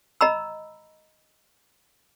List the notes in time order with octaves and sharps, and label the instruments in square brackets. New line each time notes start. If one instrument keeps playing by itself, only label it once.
[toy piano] D#5 A#5 B5 E6